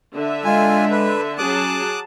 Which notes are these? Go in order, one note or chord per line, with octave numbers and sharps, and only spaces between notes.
D3 E5
G#3 F4 G#5
B4
F#3 C#4 G#4 A5 D6 D#6 F#6